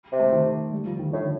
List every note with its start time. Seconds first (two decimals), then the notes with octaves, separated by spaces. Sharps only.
0.12 C3
0.19 A3
0.32 D#3
0.72 G3
0.86 F3
0.99 D#3
1.12 A2 D3